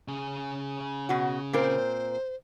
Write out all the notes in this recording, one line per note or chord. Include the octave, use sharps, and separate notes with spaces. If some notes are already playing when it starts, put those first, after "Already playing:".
C#3 G#4
B2 F#4 F#5
A#2 C4 A#4 C5